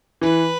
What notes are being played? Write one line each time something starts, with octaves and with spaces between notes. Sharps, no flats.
E3 B4